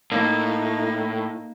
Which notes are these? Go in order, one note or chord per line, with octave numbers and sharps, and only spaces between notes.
A2 A#3 D#4